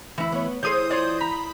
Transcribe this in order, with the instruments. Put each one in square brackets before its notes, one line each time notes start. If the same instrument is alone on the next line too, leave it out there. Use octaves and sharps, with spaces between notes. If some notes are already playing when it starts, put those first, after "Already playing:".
[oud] D2 [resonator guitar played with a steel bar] E3 E4
[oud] B3 C#5
[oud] E3 [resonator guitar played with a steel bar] G#4 A4 C#5 [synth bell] C5 D#6 G6
[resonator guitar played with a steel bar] F4 C#5 D5
[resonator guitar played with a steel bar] A#5 [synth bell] B5